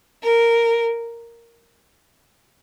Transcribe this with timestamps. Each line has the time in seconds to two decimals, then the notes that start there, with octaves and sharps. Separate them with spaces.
0.24 A#4